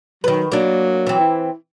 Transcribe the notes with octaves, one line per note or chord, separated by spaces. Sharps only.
D#3 F#3 B4
F#3 A#3 D4
E3 C4
E4